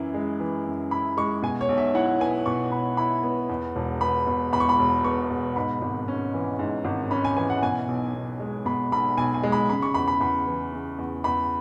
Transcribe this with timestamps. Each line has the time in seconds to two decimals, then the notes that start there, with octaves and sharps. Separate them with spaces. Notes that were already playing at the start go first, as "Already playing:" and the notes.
Already playing: F#2 E3 E4
0.14 G#3
0.40 E3
0.66 F#2
0.91 E4 B5
1.17 G#3 C#6
1.42 B2 G#5
1.61 C#5
1.69 B1
1.78 E5
1.95 E4 F#5
2.20 B3 G#5
2.46 B2 C#6
2.72 B1 B5
2.97 E4 B5
3.23 B3
3.49 E2
3.76 E1
4.01 B3 B5
4.27 B2
4.52 E2 B5
4.60 C#6
4.69 B5
4.79 E1
5.04 B3 C#6
5.30 B2
5.56 G#2 B5
5.82 G#1
6.08 C#4
6.34 E3
6.59 G#2
6.85 G#1
7.11 C#4 B5
7.25 G#5
7.37 E3 G#5
7.50 F#5
7.63 B2 G#5
7.88 B1
8.15 B1
8.40 G#3
8.66 B2 B5
8.92 B1 B5
9.17 B1 G#5
9.34 G#5
9.43 G#3
9.52 B5
9.69 C#3 B5
9.82 C#6
9.94 E2 B5
10.08 B5
10.20 E2 B5
10.47 E3
10.72 C#3
10.98 E2
11.24 E2 B5